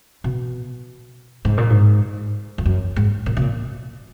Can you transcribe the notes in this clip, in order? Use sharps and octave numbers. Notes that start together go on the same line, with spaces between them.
B2
G#2
A#2
G#2
F2
F#2
G#2
A#2
B2
A#2